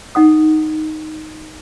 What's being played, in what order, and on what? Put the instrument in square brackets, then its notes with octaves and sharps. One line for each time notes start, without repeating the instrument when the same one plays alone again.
[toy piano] D#4 F#5 D#6